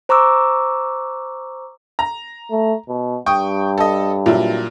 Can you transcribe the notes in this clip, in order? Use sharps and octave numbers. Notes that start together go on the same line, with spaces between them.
C5 A#5 C#6 D6 E6
A#5
A3
B2
G2 G5 C#6 D#6
A4 D#5
A#2 F#3 E4